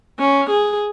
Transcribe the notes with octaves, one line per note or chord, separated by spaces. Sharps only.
C#4
G#4